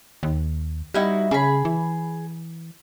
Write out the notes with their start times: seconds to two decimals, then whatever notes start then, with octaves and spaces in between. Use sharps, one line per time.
0.23 D#2
0.94 G3 D#4 E4 F#4
1.31 C#3 G#4 B5
1.65 E3